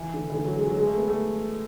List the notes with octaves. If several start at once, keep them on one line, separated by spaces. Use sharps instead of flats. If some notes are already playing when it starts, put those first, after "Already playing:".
Already playing: E3
D3
E3
D3
F#3
G#3
F#3
G#3
A3
B3
A3